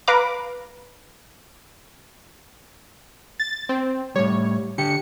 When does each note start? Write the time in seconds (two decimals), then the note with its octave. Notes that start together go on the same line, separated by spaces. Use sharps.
0.08 B4 F5 A#5 D6
3.40 A6
3.69 C4
4.16 A2 G3 C#5
4.78 D3 G4 C#7